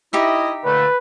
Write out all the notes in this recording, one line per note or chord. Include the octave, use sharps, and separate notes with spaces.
D#4 E4 G4 D#5 E5
A#2 D3 A3 B4